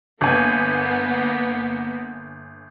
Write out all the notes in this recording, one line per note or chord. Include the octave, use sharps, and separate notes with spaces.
G1 A#3 B3 G#5